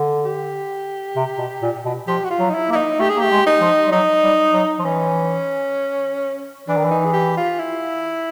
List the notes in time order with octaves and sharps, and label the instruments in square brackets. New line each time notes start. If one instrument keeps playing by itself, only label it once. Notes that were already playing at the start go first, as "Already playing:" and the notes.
Already playing: [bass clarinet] D3
[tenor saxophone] G4
[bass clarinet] C3
B2
A#2
B2
[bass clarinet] F3 [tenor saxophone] G4
[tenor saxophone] F#4
F4
[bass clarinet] F#3
[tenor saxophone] D#4
E4
[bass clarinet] A#3 [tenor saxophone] E4
[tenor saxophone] D#4
[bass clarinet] A3 [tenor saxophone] G4
[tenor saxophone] G#4
[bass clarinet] A#3
[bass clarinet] A3 [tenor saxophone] G4
[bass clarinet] G#3
[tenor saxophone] D#4
[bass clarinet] F3
G3
[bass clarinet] F#3 [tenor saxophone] D#4
[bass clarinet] G3
F#3
F3
[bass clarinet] E3 [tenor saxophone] C#4
[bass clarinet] E3 [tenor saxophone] D4
[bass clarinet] D#3
E3
[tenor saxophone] D#4
G#4
G4
F4
E4